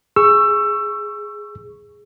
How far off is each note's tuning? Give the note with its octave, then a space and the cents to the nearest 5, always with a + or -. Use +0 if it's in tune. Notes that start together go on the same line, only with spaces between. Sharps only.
G#4 +0 C#6 +0 E6 +20